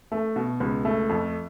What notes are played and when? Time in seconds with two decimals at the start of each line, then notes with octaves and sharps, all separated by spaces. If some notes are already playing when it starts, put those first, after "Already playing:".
0.12 A3
0.36 B2
0.60 C#2
0.85 A3
1.09 F2